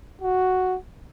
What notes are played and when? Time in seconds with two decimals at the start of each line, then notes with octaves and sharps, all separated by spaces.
0.22 F#4